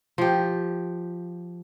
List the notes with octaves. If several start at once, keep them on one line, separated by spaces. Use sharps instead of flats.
F3 G4